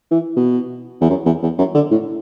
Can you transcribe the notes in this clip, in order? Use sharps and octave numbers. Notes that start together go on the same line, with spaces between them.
E3
B2
E2
F#2
E2
E2
F#2
D3
A2